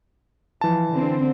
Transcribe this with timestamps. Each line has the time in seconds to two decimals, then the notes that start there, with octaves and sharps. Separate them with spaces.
0.61 E3 F3 A5
0.93 D3 C4